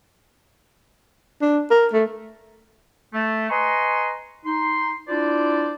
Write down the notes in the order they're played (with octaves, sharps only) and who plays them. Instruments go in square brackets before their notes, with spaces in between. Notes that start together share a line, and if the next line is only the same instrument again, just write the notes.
[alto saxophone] D4
A#4
A3
[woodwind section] A3
B4 D#5 G#5 A#5 C6 C#6
D#4 C6
D4 E4 F4 C5 D5